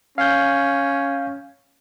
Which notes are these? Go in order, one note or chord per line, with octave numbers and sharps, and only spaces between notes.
C#4 F5 G6